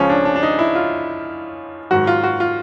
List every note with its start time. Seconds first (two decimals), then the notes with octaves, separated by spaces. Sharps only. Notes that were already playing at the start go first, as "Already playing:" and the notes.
Already playing: C#2 C#3 F3 C#4
0.09 D4
0.25 D4
0.36 D4
0.43 D#4
0.59 E4
0.75 F4
1.91 G#2 D#3 F#3 F#4
2.07 F4
2.24 F#4
2.40 F4